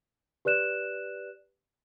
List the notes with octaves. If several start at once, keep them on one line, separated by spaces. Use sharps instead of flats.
G4 B4 D5 F#6 E7